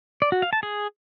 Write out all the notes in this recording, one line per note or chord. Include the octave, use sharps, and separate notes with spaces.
D5
F#4
F5
A5
G#4